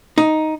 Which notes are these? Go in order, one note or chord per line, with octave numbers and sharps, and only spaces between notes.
D#4